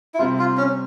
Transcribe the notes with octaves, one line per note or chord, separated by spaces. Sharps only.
E4
C3 G3 C4 F4
F4
C#4